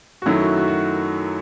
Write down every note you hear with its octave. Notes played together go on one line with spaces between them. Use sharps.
F#4
F#2 D#3 F#3 A3 E4
F#4
F#4
F#4